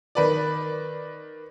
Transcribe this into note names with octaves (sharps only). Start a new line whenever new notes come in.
D#3 B4 D5